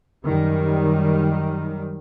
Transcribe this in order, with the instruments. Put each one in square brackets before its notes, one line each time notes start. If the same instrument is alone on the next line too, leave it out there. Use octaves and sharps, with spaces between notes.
[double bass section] F#2 D#3 G3